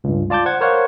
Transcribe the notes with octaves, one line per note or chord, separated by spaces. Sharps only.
C#2 G2
F4 D5 A5 D6 G6
C5 F#5 G#6
A#4 C5 C#5 F5 F#5